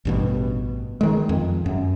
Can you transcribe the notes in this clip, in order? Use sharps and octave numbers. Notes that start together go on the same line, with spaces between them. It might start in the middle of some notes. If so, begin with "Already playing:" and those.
A1 G2 B2
D#3 G#3
F2
F#2